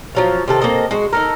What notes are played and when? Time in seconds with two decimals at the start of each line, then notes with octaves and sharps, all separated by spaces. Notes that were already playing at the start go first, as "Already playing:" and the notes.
0.15 F3 F#3 F5
0.48 C3 D#3 A4
0.62 A#3 C4 A4 D#5
0.91 G#3 F#4
1.13 D#4 A4 A#4